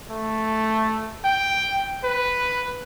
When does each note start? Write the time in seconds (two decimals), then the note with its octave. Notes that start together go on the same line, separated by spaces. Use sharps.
0.10 A3
1.24 G5
2.04 B4